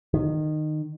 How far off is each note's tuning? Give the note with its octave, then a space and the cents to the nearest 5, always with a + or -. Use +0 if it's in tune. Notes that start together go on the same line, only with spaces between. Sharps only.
D#3 -20